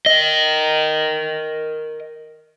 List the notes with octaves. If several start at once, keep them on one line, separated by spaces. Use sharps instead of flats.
A#4 D#5